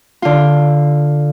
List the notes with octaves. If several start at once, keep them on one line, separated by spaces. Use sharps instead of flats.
D3 F4